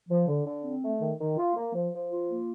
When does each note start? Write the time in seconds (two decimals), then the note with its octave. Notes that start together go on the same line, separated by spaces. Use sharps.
0.08 F3
0.26 D3
0.45 D3
0.63 C4
0.81 A3
1.00 D#3
1.19 D#3
1.37 F4
1.54 A#3
1.73 F3
1.92 F3
2.10 F4
2.29 A#3